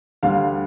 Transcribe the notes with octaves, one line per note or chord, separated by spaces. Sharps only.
D2 D3 G3 F5